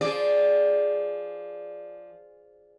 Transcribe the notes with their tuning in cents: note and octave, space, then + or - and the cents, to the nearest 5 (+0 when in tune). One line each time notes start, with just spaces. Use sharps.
F3 +0 G#4 +0 D5 +0